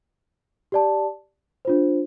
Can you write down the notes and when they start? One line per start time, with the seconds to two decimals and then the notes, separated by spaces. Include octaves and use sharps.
0.72 G4 D5 A5
1.65 D4 F4 C5